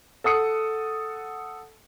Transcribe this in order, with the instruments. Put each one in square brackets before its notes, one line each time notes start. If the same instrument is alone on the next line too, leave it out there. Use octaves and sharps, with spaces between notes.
[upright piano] A4 F#5 D#6 C#7